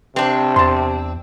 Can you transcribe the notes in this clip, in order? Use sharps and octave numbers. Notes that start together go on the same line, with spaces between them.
C3 C4 D4
E2 A5 C6